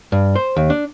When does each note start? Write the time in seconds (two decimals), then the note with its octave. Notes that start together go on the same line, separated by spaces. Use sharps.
0.12 G2
0.36 C5
0.56 D#2
0.70 D4